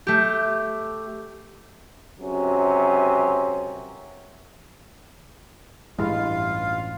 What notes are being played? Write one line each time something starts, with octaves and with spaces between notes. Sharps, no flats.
A3 G4
C#2 F#2 C3 F#3 C#4
A1 G2 G#3 E4 F4 F5